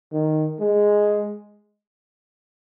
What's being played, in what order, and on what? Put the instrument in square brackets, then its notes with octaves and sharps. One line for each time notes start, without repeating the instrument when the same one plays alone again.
[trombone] D#3
G#3